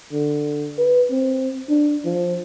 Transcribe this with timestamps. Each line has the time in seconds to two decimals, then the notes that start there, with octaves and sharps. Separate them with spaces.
0.12 D3
0.78 B4
1.11 C4
1.69 D4
2.05 F3